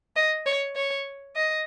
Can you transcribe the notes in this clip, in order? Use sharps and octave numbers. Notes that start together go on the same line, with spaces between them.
D#5
C#5
C#5
D#5